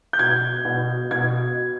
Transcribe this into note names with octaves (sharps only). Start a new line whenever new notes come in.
G6
B2 G#6
B2
B2 G#6